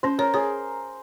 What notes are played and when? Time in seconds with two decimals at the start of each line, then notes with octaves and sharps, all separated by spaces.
0.03 C#4 C5
0.19 A#4 C#5
0.34 G#4 C#5